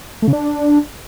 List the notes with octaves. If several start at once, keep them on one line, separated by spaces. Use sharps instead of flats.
A3
C#3
D4